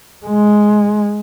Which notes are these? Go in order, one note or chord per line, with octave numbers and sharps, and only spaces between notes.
G#3